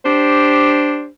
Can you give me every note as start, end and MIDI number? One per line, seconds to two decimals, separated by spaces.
0.05 1.07 62
0.05 1.07 67
0.05 1.07 72